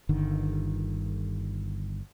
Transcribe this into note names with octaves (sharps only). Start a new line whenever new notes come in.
G1 D3 D#3